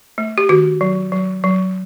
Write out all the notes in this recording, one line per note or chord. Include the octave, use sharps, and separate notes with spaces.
A3
G4
D#3 F#4
F#3
F#3
F#3